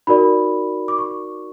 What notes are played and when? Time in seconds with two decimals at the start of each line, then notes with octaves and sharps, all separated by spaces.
0.07 D#4 F#4 A#4 D5 B5
0.88 D6
0.98 C#6